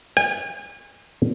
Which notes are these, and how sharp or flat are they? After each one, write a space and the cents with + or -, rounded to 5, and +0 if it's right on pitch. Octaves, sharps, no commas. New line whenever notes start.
G#5 -35